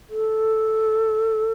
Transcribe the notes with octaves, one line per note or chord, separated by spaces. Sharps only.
A4